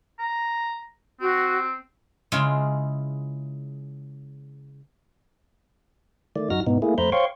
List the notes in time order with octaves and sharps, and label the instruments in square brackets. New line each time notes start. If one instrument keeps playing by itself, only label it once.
[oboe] A#5
[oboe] C4 [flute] F#4
[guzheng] C#3 G#3 E4 F4
[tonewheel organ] D#3 A3 D5
F#2 D#4 F#4 F6 A#6
G#2 B2 B3 D#4
A3 A#3 E4 G#4
F2 A3 C5 A#5 B5 G6
C5 C#5 F5 G5 C6 C#6